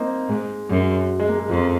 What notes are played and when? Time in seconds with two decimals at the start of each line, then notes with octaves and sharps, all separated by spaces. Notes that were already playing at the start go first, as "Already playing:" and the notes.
Already playing: A#3 C4 D#4
0.29 G#2 G#3
0.69 F#2 F#3
1.20 G#3
1.29 A#3
1.39 G#3
1.49 F2 F3